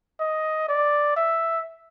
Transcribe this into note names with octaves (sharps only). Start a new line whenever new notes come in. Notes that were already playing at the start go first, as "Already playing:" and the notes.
D#5
D5
E5